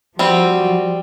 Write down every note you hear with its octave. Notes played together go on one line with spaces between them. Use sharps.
F3 G3 C4 F#4